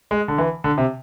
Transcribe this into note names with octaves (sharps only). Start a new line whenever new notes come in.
G#3
D3
E3
D3
C3